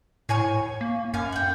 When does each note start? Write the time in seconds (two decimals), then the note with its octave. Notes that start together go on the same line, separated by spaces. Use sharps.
0.29 A2 C#5 G#5 C#6
0.81 A#3
1.14 F#2 F5 G#5
1.32 F#5 G5